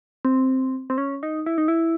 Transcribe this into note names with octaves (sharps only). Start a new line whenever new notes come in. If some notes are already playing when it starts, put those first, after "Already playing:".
C4
C4
C#4
D#4
E4
D#4
E4